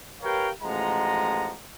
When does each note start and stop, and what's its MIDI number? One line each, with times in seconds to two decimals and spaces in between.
0.22 0.49 67
0.22 0.49 70
0.22 0.49 71
0.22 0.49 73
0.22 0.49 77
0.22 0.49 79
0.61 1.53 33
0.61 1.53 53
0.61 1.53 56
0.61 1.53 75
0.61 1.53 78
0.61 1.53 82